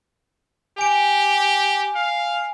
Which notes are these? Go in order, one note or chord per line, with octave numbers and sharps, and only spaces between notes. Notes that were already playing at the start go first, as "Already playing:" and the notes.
G4 G#5 D7
F5